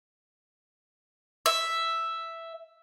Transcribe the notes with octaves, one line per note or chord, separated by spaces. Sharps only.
E5